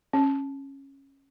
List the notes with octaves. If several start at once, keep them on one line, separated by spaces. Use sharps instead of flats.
C#4